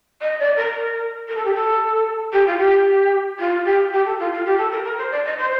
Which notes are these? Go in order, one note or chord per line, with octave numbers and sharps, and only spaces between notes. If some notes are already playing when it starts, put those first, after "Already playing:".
D#5
D5
A#4
A#4
A4
G4
A4
G4
F4
G4
F4
G4
G4
A4
F4
F4
G4
A4
A#4
A#4
C5
D5
D#5
C5